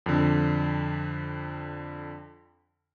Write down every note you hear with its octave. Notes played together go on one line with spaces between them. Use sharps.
F2 D3